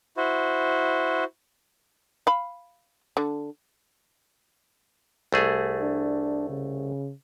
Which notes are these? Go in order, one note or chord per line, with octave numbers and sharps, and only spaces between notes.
E4 F#4 C5
F5 B5
D3
C2 A3 G#4
D4
C#3